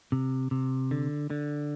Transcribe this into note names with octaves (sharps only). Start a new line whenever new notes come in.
C3
C3
D3
D3